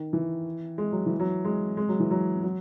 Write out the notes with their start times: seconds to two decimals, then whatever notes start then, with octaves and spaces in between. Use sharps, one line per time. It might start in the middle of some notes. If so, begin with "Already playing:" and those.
Already playing: D#3
0.13 E3
0.78 G#3
0.92 F#3
1.06 E3
1.20 F#3
1.45 G#3
1.77 G#3
1.89 F#3
2.00 E3
2.11 F#3
2.43 F#3